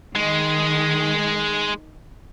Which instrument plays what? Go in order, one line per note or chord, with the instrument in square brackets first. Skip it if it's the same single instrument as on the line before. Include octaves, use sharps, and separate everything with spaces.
[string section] D#3 [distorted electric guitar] G#3